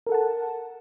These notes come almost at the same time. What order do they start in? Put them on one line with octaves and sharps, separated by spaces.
A#4 A4 F#5 A5